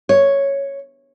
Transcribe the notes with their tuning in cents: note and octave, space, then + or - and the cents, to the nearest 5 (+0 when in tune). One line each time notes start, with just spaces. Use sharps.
C#5 +0